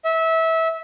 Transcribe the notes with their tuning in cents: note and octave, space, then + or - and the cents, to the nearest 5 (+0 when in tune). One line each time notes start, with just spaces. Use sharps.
E5 -25